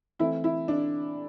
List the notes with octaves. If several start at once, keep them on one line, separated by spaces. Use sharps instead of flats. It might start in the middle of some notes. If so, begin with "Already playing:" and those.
E3 A3 C4 E4
E4
D4